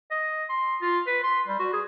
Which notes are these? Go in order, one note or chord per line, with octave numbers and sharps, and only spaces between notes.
D#5
C6
F4
B4
C6
G3
F#4
G#4